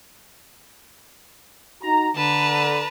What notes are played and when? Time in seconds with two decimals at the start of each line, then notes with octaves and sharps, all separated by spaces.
1.83 D#4 F#4 A#5
2.16 D3 B4 A5 A#5